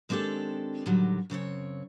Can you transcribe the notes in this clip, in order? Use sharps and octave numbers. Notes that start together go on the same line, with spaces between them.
D#3 G#3 C4 D4 G4 A4
A2 D3 D#3 F#3 G3
F#2 C#3 C4 C#5